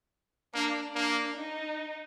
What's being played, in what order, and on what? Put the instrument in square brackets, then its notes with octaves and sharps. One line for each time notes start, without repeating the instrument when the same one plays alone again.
[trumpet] A#3 [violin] D4
[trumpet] A#3 [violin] D4
[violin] D#4